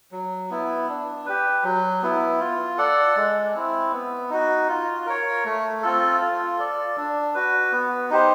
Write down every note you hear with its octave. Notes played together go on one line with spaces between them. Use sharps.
F#3
B3 E4
D4
G4 B4
F#3
B3 E4
F4
A4 D5 F#5
G#3
C4 E4
B3
D#4 F#4
F4
A#4 C#5
A3
C4 F4 A4
F4
A4 D5
D4
F#4 B4
B3
D#4 G4 C5